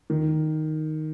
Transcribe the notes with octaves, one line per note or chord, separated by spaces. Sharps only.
D#3